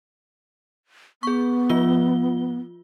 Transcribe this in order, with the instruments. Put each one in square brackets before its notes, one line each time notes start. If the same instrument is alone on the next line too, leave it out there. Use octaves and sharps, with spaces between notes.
[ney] B3 [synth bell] G#4 C#6
[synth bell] F3 F4 G7